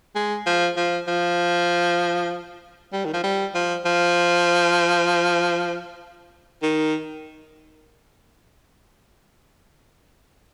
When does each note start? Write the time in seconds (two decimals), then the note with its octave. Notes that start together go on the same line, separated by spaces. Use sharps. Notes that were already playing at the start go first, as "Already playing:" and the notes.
0.15 G#3
0.46 F3
0.77 F3
1.08 F3
2.93 G3
3.05 D#3
3.14 F3
3.23 G3
3.55 F3
3.85 F3
6.62 D#3